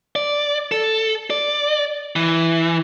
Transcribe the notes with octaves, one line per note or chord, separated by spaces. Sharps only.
D5
A4
D5
E3